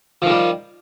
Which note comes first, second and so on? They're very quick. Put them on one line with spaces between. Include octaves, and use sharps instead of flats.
F3 D#3 G3